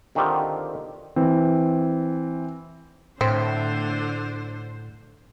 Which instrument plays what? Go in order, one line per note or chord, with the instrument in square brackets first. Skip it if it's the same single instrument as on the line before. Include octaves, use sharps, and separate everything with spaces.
[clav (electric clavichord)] D3 D#3 C4 F4 G4
[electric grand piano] E3 C4
[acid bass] A2 [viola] D3 C5 [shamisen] C4